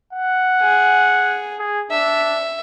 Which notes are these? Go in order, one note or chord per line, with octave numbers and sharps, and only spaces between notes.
F#5
G#4
G#4
D4 E5